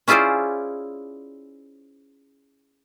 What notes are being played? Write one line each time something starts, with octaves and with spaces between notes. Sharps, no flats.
C#4 E4 F4 G#4 C5 D5